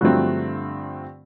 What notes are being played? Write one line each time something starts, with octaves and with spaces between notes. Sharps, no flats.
G2 D3 F3 F#3 A3 C4 F#4